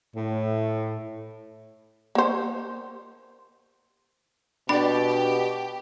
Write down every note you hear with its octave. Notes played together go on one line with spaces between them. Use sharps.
A2
A#3 C5
B2 D4 G4 D5 B5